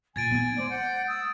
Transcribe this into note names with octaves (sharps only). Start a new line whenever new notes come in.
A#2 G#5 G#6 A6 D7
B3 D#4
G#3 C5 D5
F#5 G6
D#6 E6